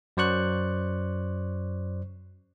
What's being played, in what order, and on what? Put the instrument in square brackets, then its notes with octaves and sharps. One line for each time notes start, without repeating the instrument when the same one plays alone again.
[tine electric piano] F#2 F#3 C5 D5 C#6 F#6